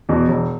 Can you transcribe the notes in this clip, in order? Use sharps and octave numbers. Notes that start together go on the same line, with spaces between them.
E2 B2
E1